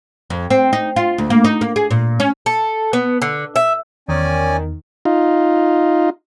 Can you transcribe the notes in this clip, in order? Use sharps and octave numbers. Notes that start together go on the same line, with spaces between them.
F2
C4
D#4
F4
D2
A#3
D#4
A#3
G#4
A#2
C#4
A4
B3
D3
E5
E2 D#3 C#4 D5 G#5
D#4 F4